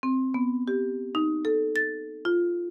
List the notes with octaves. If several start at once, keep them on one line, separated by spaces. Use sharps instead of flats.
C4
B3
G4
D#4
A4
A6
F4